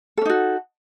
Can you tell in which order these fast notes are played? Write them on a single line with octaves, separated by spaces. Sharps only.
A4 C#4 D#4 F#4